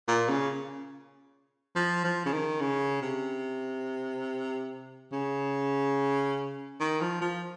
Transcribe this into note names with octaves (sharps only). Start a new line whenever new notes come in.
A#2
C#3
F3
F3
C#3
D#3
C#3
C3
C#3
D#3
F3
F3